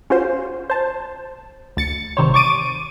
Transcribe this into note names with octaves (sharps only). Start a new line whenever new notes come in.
C#4 F4 F#4 C5
C5 A5
D2 A6 C#7
G#1 C3 D#3 G3 C5 C#5
C#6 D6 A6 D7 D#7